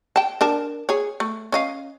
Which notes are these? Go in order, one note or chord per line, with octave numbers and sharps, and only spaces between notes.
G5 A5
D4 A#4 A5
G#4 C#5
A3
C#4 D#5 F5